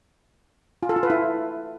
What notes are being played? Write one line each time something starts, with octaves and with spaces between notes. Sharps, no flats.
F4
A4
F4
B4
E4